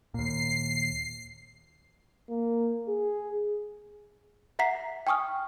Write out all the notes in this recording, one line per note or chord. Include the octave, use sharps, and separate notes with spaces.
D#2 A#2 C7
A#3
G#4
E5 F#5 A#5 B6 C7
G5 G#5 C#6 D#6 F6